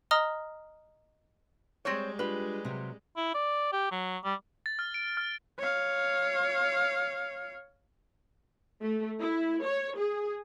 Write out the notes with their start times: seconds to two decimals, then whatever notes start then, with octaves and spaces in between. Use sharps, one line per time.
0.11 D#5 A#5 D#6 F6 G7
1.85 G3 G#3 C4 C5 C#5
2.19 D4 F4 G4 B4
2.65 C3 F#3
3.17 E4
3.34 D5
3.72 G4
3.92 F#3
4.24 G3
4.66 A6
4.79 F6
4.94 D7
5.17 F6
5.59 C#5 F5
8.82 A3
9.20 E4
9.63 C#5
9.97 G#4